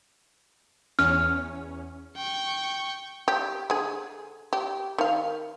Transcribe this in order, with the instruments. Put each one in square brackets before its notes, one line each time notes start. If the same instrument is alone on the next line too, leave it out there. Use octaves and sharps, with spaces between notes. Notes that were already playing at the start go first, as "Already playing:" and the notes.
[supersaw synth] E2 C#4 [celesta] F6
[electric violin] G5 C#6
[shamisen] G4
D3 G#4
G4
D#3 F5